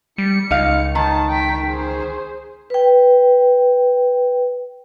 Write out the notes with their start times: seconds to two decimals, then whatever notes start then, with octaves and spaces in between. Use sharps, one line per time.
0.18 G3 C#7
0.51 C#2 D#4 F5
0.95 D#3 D#5 A5
1.28 G5 B6
1.66 G#4 C5
2.70 B4 G5